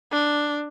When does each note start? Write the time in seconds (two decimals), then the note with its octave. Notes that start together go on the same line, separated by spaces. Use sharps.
0.12 D4